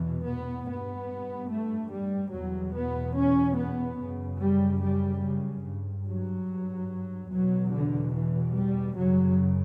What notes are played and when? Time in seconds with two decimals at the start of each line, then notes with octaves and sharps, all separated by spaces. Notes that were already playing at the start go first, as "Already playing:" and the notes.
Already playing: E2 B2 E3
0.27 B3
0.68 G2 B3
1.51 A3
1.92 G3
2.33 E2 B2 F#3
2.76 B3
3.17 C#4
3.58 B3
4.00 F#2 C#3
4.41 G3
4.83 G3
5.24 C#3
5.66 G2
6.08 F#3
7.31 E2 B2 F#3
7.72 D3
8.14 E3
8.56 G3
8.97 F#2 C#3 F#3